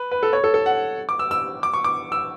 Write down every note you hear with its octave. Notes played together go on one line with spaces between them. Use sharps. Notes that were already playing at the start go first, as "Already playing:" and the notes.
Already playing: B4
B4
A4
C#5
A4
A4
F#5
D6
E6
E6
D6
C#6
D6
E6